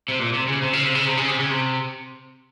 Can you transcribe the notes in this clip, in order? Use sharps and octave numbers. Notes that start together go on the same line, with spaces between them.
C3
A#2
C3
C#3
C3
C#3
C3
C#3
C3
C#3
C3
C#3
C3